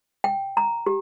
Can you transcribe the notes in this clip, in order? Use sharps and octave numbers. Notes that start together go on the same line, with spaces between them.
G5
A#5
G4